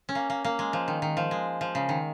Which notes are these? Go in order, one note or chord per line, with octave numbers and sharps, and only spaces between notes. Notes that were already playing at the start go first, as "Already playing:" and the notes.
C#4
A#3
A#3
A#3
G#3
F3
D#3
D#3
F3
G#3
F3
C#3
D#3